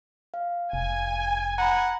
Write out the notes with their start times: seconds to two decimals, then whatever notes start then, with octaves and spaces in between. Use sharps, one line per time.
0.34 F5
0.73 F1 G#5
1.58 F#5 A#5 B5